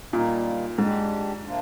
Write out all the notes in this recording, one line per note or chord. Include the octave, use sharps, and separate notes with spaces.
A#2 G3 A#3 D#4
G#2 G#3 D4 G4
C3 F3 A#3 D4 F4